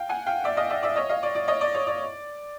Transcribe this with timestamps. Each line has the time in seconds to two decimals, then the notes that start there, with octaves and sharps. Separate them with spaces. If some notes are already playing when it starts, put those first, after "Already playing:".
Already playing: F5 G5
0.09 F#5 G#5
0.26 F5 G5
0.44 D5 E5
0.57 D#5 F5
0.70 D5 E5
0.83 D5 E5
0.96 C#5 D#5
1.09 D#5 F5
1.23 D5
1.35 D5
1.48 C#5 D#5
1.61 D5
1.75 C#5
1.87 D5